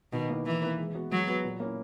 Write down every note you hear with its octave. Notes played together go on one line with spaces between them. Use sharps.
B2 D#3
A#3 E4 B4
D#3 E3
A#3 E4 B4
G#3
B3 F#4 B4
F#3 G#3
B3 F#4 B4
A#2
A#3 C#4 E4